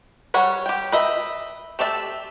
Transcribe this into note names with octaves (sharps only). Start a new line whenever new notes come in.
G3 C#5 F#5
G4 G5
B4 D#5 E5
A3 G4 D5 E5 A5